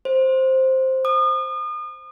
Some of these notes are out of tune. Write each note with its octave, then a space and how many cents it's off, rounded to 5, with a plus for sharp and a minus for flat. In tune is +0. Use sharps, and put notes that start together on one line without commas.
C5 +5
D#6 -35